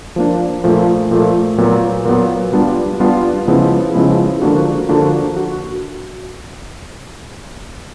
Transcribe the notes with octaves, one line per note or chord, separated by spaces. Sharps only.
F3 A#3 D4
A#2 F3 A3
A#2 F3 A3
A#2 F#3 B3
A#2 F#3 B3
G3 B3 D4 F4
G3 B3 D4 F4
C#3 F3 G#3 B3 E4
C#3 F3 G#3 B3 E4
D3 F3 A#3 D4 F#4
D3 F3 A#3 D4 F#4
F#4